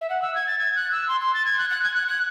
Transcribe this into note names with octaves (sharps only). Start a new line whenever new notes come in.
E5
F#5
E6
G#6
A6
G#6
F#6
E6
C6
C6
A6
G#6
F#6
F#6
G#6
F#6
F#6